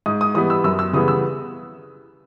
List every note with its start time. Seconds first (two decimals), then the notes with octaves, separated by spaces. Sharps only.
0.06 G#2 D#6
0.21 D#6
0.34 E3 G3 B3 D#6
0.50 E6
0.64 F#2 E6
0.79 E6
0.93 C#3 E3 G3 B3 D#6
1.08 E6